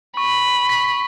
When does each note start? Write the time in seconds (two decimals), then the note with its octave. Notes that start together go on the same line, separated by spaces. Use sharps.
0.17 B5 C#6
0.69 B6